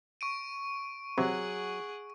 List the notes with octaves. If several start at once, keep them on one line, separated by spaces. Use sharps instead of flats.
C#6 D7 D#7
C3 F#3 G#4 F#5